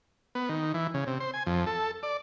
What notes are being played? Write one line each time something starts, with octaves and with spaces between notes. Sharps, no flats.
B3
D#3
E3
C#3
C3
C5
G#5
F2
A4
D5